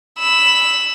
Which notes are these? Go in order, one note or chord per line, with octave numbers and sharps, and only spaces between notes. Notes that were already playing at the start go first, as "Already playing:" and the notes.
B5 E6